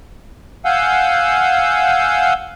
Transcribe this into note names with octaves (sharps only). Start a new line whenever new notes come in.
F5 F#5 G#5 E6 G6